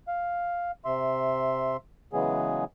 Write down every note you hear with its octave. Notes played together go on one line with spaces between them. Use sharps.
F5
C3 E5 C6
C#3 E3 F#3 G#3 B3 G#4